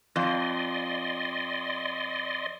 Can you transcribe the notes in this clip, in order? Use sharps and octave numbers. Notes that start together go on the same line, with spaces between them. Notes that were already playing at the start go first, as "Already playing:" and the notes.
F2 D5 D#5 C6